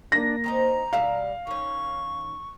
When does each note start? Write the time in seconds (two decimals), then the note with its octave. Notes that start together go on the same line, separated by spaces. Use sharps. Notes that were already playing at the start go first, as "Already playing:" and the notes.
0.12 A#3 D4 A#6
0.44 D#3 C4 D#4 A#5
0.93 B2 G3 E5 F5
1.47 D#3 C#4 C#6